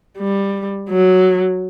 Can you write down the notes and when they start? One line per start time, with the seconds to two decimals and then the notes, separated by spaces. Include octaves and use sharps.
0.18 G3
0.90 F#3